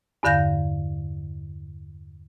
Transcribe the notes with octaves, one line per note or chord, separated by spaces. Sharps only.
E2 G2 D3 F5 G6 A#6